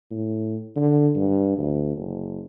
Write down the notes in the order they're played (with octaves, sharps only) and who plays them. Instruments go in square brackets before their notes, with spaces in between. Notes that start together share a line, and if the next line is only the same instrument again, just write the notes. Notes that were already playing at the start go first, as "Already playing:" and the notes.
[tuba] A2
D3
G2
D2
F#1